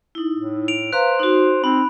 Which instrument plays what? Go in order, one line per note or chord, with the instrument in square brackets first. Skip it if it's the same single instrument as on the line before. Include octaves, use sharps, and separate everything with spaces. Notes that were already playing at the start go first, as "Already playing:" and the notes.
[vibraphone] D#4 E4
[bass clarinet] A2
[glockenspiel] D7 F7
[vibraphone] B4 F5 A#5 [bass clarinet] C5 [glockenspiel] F#6
[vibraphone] D#4 F#4
[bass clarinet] C4 [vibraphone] D#4 [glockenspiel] B5